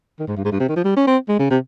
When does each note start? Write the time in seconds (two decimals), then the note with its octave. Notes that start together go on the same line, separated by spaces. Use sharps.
0.20 D#3
0.27 G#2
0.37 G2
0.45 G#2
0.52 G2
0.60 C3
0.68 D#3
0.76 F3
0.84 G3
0.97 C#4
1.07 C4
1.29 G#3
1.39 C#3
1.50 C3